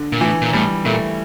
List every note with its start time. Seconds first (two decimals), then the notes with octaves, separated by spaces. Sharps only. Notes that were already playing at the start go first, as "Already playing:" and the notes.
Already playing: D3
0.12 A#2
0.20 A2 E3
0.41 A#2
0.53 A2 G3
0.85 A#2 A3